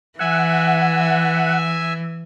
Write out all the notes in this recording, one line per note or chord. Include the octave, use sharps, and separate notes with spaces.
E3 E5 F#5 G#5